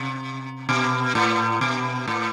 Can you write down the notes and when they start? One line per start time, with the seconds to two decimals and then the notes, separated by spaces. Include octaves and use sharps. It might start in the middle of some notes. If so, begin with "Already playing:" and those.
Already playing: C3
0.69 B2
1.15 A2
1.61 B2
2.08 A2